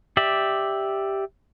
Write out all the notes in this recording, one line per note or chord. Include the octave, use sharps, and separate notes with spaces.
G4 D5 E5